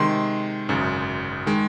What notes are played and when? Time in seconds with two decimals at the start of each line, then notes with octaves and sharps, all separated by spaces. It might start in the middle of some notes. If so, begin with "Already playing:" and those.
Already playing: C3 D#3 G#3 C6
0.69 G#1 F#2 C#3
1.46 D#3 G#3